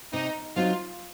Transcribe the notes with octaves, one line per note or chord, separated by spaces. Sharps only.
C3 D#4
F#3 C4 D#4 F4